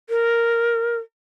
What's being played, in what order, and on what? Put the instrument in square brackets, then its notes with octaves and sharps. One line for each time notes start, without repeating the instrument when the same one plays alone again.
[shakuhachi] A#4